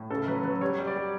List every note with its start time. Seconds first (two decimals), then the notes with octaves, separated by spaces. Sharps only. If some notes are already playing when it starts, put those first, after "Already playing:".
Already playing: A2
0.10 C#3 A4
0.27 F#3 B4
0.44 F#3 B4
0.61 G3 C#5
0.79 G3
0.87 D5
0.96 G3